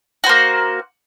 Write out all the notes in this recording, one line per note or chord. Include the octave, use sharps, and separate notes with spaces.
A#3 F#4 C5